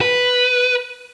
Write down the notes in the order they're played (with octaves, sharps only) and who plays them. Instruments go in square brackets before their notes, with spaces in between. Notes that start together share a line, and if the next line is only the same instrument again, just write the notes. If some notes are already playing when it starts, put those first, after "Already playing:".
[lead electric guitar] B4